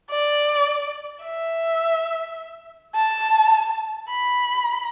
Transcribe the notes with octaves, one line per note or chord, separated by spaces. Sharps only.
D5
E5
A5
B5